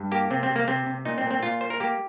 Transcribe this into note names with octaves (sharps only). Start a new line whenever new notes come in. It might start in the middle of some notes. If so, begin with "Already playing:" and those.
Already playing: G2
A#3 G4
C3 C4
C4
C3
A#3
C3 C4
C3
A#2 D#4
C4
A#2
C4
A#2 F4
A#3 C5
A#4
A#3 G4